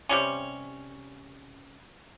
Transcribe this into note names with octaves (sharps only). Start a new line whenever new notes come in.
C3 G3 C#4